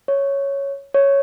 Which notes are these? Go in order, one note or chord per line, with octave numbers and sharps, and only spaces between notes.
C#5
C#5